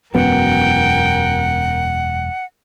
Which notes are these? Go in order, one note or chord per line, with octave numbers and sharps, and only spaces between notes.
E1 F#2 B3 A#4 F#5 G5